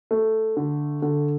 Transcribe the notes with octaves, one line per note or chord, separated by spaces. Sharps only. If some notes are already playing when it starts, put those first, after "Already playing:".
A3
D3
D3